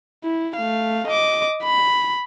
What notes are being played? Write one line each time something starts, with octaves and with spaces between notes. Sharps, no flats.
E4
A3 F5
D#5 D6
B5